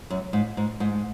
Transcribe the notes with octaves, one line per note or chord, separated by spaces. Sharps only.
F#2
G#2
G#2
G#2